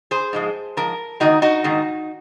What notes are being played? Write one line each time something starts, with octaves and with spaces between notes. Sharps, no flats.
G#4 C5
G#2 F3 G#3
G#2 F3 A#4
G#2 D#3 A#3 D#4 F#4
D#4 F#4
G#2 D#3 A#3